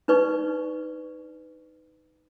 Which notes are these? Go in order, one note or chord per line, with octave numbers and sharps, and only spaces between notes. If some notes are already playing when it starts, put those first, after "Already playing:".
D4 D#4 B4 D5 C#6